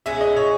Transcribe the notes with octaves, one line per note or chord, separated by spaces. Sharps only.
B2 G#3 C#4 G#4 E5
D#5
C#5